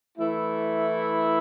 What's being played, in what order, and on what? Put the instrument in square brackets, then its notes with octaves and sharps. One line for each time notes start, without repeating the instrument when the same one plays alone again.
[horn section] E3 A3 E4